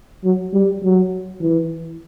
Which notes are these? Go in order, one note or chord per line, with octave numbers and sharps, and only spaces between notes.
F#3
G3
F#3
E3